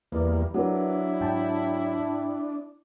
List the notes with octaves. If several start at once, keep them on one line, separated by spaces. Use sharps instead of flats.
E2 G3 A#3 B4 D5
F#3 D4 E4 A#4
G#2 G5 A5